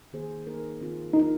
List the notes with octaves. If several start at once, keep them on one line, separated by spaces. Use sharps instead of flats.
D#3 A#3 G#4 C5
A#3 D#4 A#4
D#3 C4 F4
A#3 D#4 F4 A#4